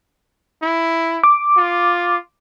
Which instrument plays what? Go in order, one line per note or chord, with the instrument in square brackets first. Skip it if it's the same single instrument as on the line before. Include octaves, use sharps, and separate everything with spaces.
[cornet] E4
[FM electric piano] D6
[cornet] F4